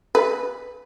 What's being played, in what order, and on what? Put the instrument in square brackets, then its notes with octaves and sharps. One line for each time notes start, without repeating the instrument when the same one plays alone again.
[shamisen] B4